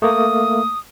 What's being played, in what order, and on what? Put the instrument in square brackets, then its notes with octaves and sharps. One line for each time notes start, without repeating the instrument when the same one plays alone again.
[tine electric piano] A3 A#3 [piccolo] D#6